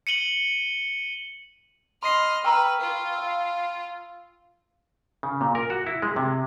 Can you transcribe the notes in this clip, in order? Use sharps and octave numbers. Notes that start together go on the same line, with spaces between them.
C#7 D#7 F#7 G7
D#5 B5 C6 F6 C7
B4 G5 A#5 B5 C#6 E6 F6
F4
F5 E6
C#3
A#2
A#4
F#4
E4
G#3
C3